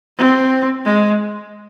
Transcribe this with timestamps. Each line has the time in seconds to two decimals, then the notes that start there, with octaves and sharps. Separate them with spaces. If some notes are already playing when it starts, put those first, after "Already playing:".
0.18 C4
0.85 G#3